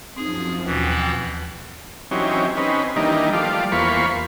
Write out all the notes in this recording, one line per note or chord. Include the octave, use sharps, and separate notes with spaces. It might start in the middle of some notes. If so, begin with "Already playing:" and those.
F#2 F3 C4 D#4 G#4
D#2 B2 E3 F#5 G5 F#6
E3 F#3 C4 C#4 D#4 G4
C4 C#4 D#4 B4
D#3 E3 G3 A#3 D4 D#4
F3 G3 A3 F4 D5
E2 A#3 F4 C5 B5 C#6